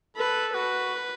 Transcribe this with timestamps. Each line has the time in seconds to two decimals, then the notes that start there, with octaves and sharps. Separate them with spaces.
0.17 A4 B4
0.54 F#4 B4